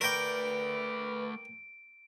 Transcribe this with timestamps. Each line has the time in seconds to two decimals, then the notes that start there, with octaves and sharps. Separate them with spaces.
0.01 A3 A#4 B4 D5 G5 D7